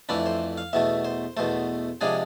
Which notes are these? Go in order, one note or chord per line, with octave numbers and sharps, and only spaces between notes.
F2 E3 A3 D4 B5
C5
F5
E2 B2 A3 E5
C5
E2 B2 A3 C5
C3 F3 G#3 D4 G#4